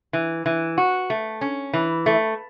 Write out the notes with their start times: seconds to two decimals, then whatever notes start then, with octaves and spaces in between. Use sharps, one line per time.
0.13 E3
0.46 E3
0.78 F#4
1.10 A3
1.41 C#4
1.73 E3
2.06 A3